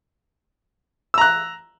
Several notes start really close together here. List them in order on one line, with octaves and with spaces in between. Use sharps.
E6 A#5 F#6